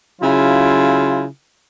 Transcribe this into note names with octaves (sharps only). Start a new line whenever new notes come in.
C#3 F#3 E4 F4